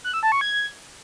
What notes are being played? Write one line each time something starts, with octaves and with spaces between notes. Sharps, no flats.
F#6
E6
A5
C#6
G#6